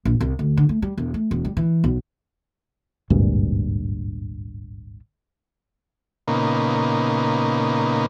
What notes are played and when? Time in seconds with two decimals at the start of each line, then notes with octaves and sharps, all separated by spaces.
0.05 A#1
0.20 C2
0.39 D2
0.57 D3
0.69 A3
0.82 G3
0.97 E1
1.14 A3
1.31 E1
1.45 G3
1.57 E3
1.84 B1
3.10 G#1 D2 G2 A#2
6.28 A#2 C#3 A#3 B3 D#4